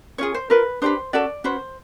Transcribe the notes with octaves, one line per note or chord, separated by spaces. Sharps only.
C#4 F4 G#4 C#5
C5
F4 A#4 B4
D4 G4 B4 C5
C#4 F#4 A4 D5
C#4 F#4 B4 C5